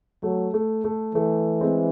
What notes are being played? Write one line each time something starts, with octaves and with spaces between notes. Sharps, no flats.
F#3 A3
A3
A3
E3 A3
G#3 C4